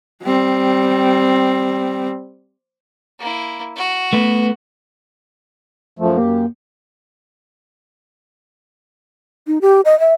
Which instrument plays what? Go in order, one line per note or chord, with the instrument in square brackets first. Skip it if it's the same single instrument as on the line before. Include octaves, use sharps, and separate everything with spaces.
[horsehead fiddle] G3 C4
[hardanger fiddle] A#3 E4
F#4
[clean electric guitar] A3 B3 B4
[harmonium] F#2 F3 A3
[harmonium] F#2 G4 [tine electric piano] A#3
[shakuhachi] D#4
G4
D#5
E5